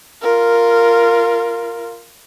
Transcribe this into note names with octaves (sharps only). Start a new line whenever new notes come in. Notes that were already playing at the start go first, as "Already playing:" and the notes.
F4 A#4